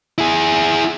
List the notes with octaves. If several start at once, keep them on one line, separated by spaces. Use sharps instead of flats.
E4 G#4